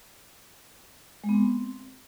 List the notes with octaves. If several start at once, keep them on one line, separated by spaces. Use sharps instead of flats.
G#3
B3
C4